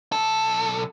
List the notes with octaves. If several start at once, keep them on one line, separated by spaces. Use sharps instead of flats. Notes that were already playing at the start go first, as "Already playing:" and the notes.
B1 A4